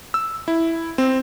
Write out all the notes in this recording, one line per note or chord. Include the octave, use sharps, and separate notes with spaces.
E6
E4
C4